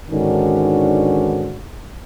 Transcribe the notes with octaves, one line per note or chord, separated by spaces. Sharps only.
G#2 D3 D#3 C#4 D4 F#4